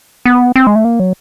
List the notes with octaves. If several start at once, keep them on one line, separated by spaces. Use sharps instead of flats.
B3
C4
G#3
A3
A#3
F#3